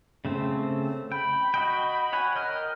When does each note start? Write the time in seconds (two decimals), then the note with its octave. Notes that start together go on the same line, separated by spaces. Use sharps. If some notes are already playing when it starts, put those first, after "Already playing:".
0.25 C#3 A3 C4
1.12 G5 B5
1.54 F#4 D#5 G5
2.13 C#5 F#5 G#5
2.36 A#4 D#5 G5 F6